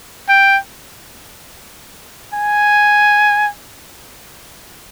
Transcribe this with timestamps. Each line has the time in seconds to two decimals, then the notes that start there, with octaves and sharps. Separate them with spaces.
0.29 G5
2.34 G#5